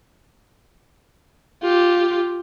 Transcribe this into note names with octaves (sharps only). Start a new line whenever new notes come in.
F4 G4